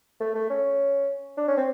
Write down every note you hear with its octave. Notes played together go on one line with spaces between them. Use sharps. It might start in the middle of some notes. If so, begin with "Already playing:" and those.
A3
A3
C#4
D4
C#4
C4